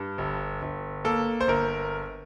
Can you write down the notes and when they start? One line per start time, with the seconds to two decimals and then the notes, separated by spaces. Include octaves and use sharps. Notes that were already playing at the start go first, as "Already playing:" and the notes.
Already playing: G2
0.18 G1
0.62 G1
1.04 A#3 A4
1.41 C5
1.48 G1 A#4